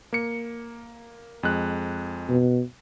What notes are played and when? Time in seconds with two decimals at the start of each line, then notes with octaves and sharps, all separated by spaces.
0.13 A#3 C#7
1.43 F2 G#3 F#6
2.29 B2